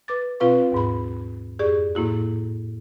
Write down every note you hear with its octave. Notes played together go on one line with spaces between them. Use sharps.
B4 D6 A6
B2 C4 F4 B4 F5 C#6
D#2 G#2 B5
F2 G4 G#4 D5 C#6
A2 A#3 E4 F#4